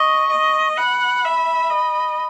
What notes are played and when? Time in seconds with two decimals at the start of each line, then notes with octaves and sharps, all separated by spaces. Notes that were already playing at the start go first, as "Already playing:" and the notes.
Already playing: D#5 C#6
0.31 D#5
0.78 F#5 B5
1.25 E5
1.71 D#5